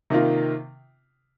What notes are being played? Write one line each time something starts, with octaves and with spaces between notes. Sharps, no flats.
C3 D#3 A#3 F4